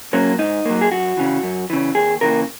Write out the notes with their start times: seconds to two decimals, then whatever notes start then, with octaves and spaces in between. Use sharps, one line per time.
0.13 F#3 A#3 C#4
0.38 G#2 D#4
0.65 F#3 A#3
0.81 G#4
0.91 F#2 F#4
1.17 C#3 E3
1.43 F#2
1.70 C#3 E3
1.95 D#2 G#4
2.21 C#3 E3 A#3 A#4